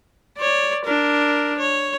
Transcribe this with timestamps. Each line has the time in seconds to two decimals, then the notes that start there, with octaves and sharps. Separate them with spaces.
0.38 C#5 D5
0.85 D4 A#4
1.59 C#5